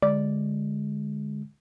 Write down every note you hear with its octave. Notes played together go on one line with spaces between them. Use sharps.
D3 G#3 D5